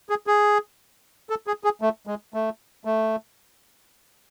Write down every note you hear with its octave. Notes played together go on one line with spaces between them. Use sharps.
G#4
G#4
A4
G#4
G#4
A3
G#3
A3
A3